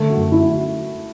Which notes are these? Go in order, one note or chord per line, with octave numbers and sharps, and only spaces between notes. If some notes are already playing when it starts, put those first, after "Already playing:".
Already playing: D3 A3
F#4
F#2
E4
F#4